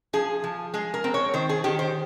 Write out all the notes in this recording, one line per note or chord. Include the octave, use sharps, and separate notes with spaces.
F3 G#4
F3
G#3 G#4
A#4
C4
C#5
D#3 C5
G#4
D#3 G4
C5